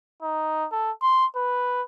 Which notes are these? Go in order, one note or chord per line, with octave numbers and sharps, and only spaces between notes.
D#4
A4
C6
B4